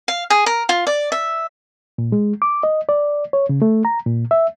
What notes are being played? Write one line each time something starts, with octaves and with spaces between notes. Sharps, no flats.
F5
G#4
A#4
F4
D5
E5
A#2
G#3
D6
D#5
D5
C#5
C#3
A3
A#5
A#2
E5